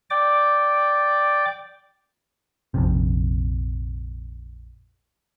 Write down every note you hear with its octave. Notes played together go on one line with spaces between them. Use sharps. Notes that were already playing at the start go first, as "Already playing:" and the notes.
D5 G5 D6
A#1 F2 C3